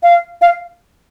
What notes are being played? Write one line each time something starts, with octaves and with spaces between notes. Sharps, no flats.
F5
F5